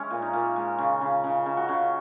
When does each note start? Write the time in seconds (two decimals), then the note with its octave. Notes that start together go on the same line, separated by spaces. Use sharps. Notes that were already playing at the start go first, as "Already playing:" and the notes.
Already playing: G#3 C#4 E4
0.11 A#2
0.22 D#4
0.33 A#2
0.56 G#3
0.78 C#3
1.01 C#3
1.24 C#3
1.46 C#3
1.57 F#4
1.69 C#3